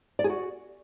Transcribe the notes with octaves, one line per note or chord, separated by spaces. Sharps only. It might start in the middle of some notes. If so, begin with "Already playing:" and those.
D5
G#4
F#4